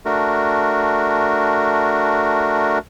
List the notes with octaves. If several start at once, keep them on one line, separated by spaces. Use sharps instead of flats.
A3 D4 F#4 A#4